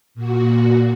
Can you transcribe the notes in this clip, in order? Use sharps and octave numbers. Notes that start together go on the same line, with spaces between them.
A#2 F#4